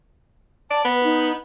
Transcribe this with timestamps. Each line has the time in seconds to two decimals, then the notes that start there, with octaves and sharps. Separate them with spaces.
0.70 D5 A5
0.85 B3 B4
1.04 D#4